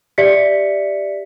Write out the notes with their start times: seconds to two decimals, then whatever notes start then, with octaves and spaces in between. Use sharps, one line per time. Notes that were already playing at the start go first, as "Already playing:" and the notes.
0.18 G4 D5 E5 B6 C#7